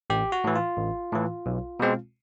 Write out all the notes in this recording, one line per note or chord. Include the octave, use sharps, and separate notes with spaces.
A1 G4
F#4
A2 E3
F4
A1
A2 E3
B1
B2 G#3 C4